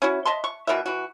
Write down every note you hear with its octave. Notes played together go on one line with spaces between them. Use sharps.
C#4 E4 F#4
D#5 E5 A5 C6
C#6
B2 E3 A#4 E5
E3 F#4